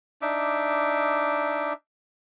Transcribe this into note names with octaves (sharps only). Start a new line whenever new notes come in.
D4 D#4 E5 D6